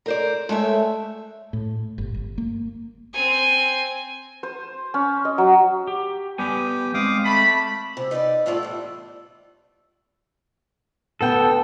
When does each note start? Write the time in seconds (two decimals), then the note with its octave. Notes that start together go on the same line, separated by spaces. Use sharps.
0.06 A#4 C5 D5
0.49 G#3 A3 C#5 E5
1.53 A2
1.98 G1
2.14 G1
2.38 A#3
3.13 C4 G#5
4.43 C5
4.94 C#4
5.25 D#5
5.38 F#3
5.87 G4
6.38 G3 B3 G4 G#5
6.94 G#3 C4 F5 D6 D#6
7.25 A3 A5 B5
7.97 C3
8.11 D#4 B4 C#5 D5
8.46 F2 A2 A3 E4 F4 D5
8.63 E2 G3
11.21 D2 B3 A4 G5